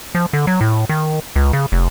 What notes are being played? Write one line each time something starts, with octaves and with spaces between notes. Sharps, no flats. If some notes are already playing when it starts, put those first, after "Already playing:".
F3
D3
F#3
A2
D#3
C#2
C#3
F1